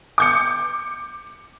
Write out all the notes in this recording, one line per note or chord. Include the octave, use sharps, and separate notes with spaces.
D6 G6 C#7